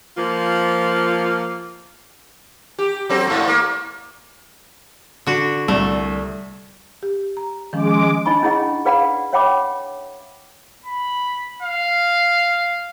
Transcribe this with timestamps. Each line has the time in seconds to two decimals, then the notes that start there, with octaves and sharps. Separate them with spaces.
0.17 F3 A#3 F4
2.79 G4
3.09 F#3 C4 A4
3.27 G#2 A3
3.48 A#3
5.27 D3 F#4
5.68 C2 A3 D5
7.03 G4
7.37 A#5
7.73 D#3 F3 G#3 C#4 D6
8.26 D4 D#4 D#5 G#5 B5 C#6
8.42 C#4 E4 G#4 D#5 F#5 B5
8.85 G#4 B4 D5 F5 F#5 B5
9.33 C#5 E5 F#5 G5 B5 D6
10.85 B5
11.63 F5